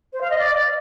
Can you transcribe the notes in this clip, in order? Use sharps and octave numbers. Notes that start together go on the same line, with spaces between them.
C5
F5
D#5
D5